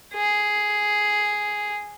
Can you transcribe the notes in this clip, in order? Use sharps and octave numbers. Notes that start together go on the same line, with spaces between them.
G#4